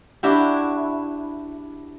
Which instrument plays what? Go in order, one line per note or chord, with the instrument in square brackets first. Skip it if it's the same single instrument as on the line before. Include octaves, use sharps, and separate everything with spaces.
[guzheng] D4 E4 F#4 G4